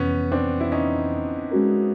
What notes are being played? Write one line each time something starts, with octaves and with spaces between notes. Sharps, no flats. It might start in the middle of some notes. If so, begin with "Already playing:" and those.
Already playing: F2 C3 E3 B3 C#4
C4 D4
E4
C#4 D#4
G#3 C#4 F#4 A#4